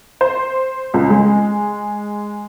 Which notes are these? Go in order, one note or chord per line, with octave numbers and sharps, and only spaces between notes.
C5
C#2
G#3